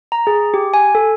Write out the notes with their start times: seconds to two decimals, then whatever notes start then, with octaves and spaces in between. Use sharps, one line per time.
0.12 A#5
0.27 G#4
0.54 G4
0.74 G#5
0.95 A4